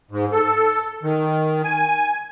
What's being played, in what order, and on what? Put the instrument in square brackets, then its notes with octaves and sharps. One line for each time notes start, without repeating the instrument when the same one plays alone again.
[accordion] G#2
A4
D#3
G#5